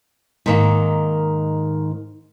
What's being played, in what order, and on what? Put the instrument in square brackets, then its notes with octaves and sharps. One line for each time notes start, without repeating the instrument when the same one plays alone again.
[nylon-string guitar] G#2 D#3 A#3